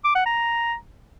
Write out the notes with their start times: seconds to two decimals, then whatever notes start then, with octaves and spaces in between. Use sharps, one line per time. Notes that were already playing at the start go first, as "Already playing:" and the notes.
0.04 D6
0.15 F#5
0.26 A#5